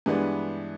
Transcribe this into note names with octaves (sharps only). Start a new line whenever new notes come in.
G2 E3 G#3 B3 D4